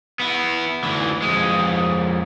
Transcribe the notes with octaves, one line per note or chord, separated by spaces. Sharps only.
B3 E4
D2 E3
F2 G#3